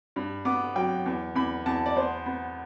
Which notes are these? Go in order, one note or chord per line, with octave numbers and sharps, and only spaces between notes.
G2
B3 D6
F#3 G5
E2
E2 B5
E2 A5
D5
B3 C5
B3